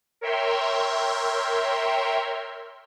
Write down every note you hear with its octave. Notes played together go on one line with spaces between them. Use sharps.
A#4 C#5 E5 G5 C6